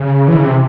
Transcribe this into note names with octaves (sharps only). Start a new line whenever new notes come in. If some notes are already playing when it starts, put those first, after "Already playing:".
Already playing: C#3
E3
C#3
C3